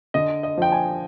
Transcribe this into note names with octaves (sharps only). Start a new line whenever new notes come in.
D3 D#5
D#5
F3 G5
G#5